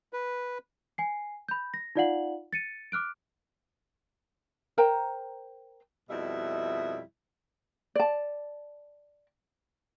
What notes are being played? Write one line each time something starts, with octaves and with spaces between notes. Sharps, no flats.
B4
G#5 C7
B5 G6
A#6
D#4 F4 D5 F5 F#5 F#7
A6 C#7 D#7
D6 F6 F#6 D7
A#4 C5 G5 A#5
F2 B2 G3 E4 D#5 E5
D5 A5